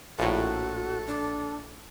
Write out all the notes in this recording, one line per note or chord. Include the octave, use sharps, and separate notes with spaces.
A#1 A2 F#4 A4
D4